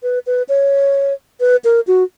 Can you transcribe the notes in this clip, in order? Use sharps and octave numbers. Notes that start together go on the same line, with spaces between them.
B4
B4
C#5
B4
A#4
F#4